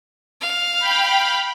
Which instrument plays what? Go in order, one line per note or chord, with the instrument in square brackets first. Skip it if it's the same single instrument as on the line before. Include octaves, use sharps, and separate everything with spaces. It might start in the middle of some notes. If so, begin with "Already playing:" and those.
[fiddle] F5
[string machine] G5 B5